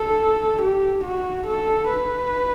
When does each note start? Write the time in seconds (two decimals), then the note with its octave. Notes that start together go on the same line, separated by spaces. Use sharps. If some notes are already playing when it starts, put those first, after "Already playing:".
Already playing: A4
0.63 G4
1.05 F#4
1.47 A4
1.90 B4